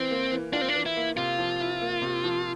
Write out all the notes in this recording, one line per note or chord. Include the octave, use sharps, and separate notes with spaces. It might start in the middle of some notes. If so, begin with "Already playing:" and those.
Already playing: E3 C4
A#3
E3
D4 F4
C4
D4
E3
E4
A#3
C3 F4
F3
E4
A#3
C3
F3